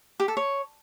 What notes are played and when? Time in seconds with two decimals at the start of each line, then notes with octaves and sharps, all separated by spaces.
0.20 G4
0.28 A4
0.37 C#5